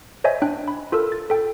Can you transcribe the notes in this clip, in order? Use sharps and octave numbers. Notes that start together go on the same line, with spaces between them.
C5 C#5 D#5 E5 G#5
D4 G5 F#6
B5
F4 A4 A#4 E6
A6
A4 G5